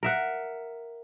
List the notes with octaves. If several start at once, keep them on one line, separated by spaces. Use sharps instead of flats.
A#4 E5 F#5